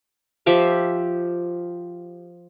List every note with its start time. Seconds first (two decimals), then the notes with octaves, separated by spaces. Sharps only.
0.46 F3 G4 E5 F5